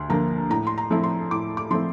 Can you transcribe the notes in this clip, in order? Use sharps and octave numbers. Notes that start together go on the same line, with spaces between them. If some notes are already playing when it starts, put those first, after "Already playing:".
Already playing: D2 C6
D3 F3 A#3 A#5
A2 A#5
C6
A#5
F3 A3 C4 E4
C6
A2 D6
D6
F3 A3 C4 E4 C6